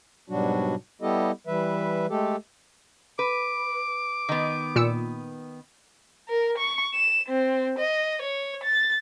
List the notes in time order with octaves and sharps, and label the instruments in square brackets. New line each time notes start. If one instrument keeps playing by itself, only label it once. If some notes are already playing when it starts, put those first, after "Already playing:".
[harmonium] G#2 B2 F#3 G3 D4 F#4
G3 B3 E4 G4 A4 D#5
E3 G3 B4 E5
G#3 A3 G4 A4
[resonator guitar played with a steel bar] B4 [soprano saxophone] D6
[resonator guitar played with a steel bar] D#3 B3
[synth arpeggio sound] A#2 E6 C#7
[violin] A#4
C#6
E7
C4
D#5
C#5
A6